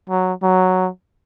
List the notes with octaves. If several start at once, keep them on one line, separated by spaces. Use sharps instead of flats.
F#3
F#3